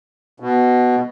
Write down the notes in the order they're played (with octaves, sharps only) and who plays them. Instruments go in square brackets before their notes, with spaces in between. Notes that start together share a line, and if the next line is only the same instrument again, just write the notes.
[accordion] B2